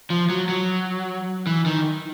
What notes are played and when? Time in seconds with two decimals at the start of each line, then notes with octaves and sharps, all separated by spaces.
0.10 F3
0.30 F#3
0.49 F#3
1.47 E3
1.66 D#3